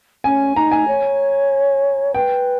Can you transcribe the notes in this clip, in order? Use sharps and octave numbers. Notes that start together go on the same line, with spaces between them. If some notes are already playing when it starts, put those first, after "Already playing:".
C#4 G#5
D#4 A#5
G#5
C#5
B4 G5